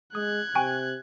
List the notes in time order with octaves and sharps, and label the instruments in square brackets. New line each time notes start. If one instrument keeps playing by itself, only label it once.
[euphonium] G#3 [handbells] D#6 [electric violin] F#6 G#6
[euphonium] C3 [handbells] G5 G#5 C#6